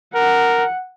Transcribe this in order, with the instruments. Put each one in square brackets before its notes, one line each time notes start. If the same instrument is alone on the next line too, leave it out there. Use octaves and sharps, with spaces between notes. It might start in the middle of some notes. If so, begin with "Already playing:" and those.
[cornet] A#4 [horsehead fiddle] F#5